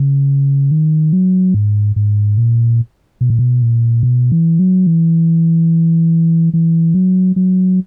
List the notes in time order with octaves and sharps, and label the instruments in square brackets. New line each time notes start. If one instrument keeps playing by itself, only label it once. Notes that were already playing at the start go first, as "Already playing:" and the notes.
Already playing: [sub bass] C#3
D#3
F#3
G#2
G#2
A#2
B2
A#2
B2
A#2
B2
E3
F#3
E3
E3
F#3
F#3